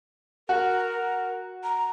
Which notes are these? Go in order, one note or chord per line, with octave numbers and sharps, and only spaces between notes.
F#4 A#4
A#5